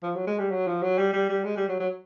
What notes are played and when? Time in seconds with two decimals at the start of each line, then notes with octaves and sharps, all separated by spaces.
0.03 F3
0.15 F#3
0.27 G#3
0.39 G3
0.51 F#3
0.67 F3
0.82 F#3
0.98 G3
1.13 G3
1.29 G3
1.44 G#3
1.56 G3
1.68 F#3
1.80 F#3